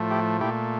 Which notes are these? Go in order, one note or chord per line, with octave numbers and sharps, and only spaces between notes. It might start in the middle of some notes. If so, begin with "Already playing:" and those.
Already playing: A2 F3 A3
E4 G4
A#2 A3 E4 G4